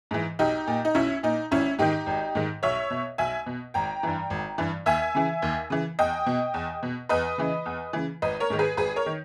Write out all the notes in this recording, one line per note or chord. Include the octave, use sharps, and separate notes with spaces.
G#2 E3
B1 D#4 G4
A#2
D#4
B1 C#4 E4
A#2 D#4
G#1 C#4 E4
G#2 D#3 D#4 G4
G#1
G#2 D#3
B1 C#5 E5
B2
B1 E5 G#5
B2
G#1 G5 A#5
G2 E3
G#1
G2 E3
D#2 E5 G#5
C#3 E3
D#2
C#3 E3
E2 D#5 G5
B2
E2
B2
E2 B4 D#5
C#3 E3
E2
C#3 E3
G#1 B4 D#5
A#4 C#5
G#2 D#3
G#4 B4
G#1 G#4 B4
A#4 C#5
D#3